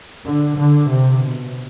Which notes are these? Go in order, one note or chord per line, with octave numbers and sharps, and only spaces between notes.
D3
D3
C3
B2